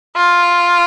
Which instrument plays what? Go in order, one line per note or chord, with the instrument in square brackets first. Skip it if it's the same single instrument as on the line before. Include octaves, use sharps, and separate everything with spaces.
[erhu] F4